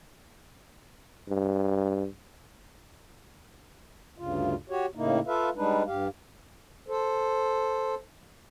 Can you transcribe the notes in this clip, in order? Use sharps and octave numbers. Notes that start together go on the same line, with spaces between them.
G2
D2 G2 C#3 F4
F#4 G4 C#5
A2 C#3 A#3 D#4 E4
F4 A4 B4 E5 F5
G3 G#3 D4 D#4 B4
G2 G4 F5
A4 C5